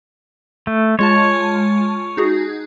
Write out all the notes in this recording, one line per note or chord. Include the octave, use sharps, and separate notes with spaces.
A3
G#3 F4 C#5 A5
D#4 F#4 G#4